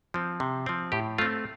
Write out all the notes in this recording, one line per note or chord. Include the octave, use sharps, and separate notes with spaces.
F3 C4
C3
F3 C4
A2 G4
A3 C4 F4